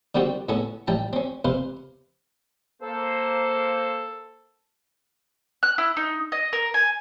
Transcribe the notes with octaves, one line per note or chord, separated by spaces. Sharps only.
D3 D#3 G3 C4 F#4 G4
A2 B3 C#4 A4
A1 G3 G5 A5
C4 C#4
C3 B4 C5 F5
A#3 A4 C5
F#6
E4
D#4
D#5
A#4
G#5